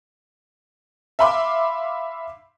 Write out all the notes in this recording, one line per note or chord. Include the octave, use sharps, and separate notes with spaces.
E5 F5 B5 C6 D6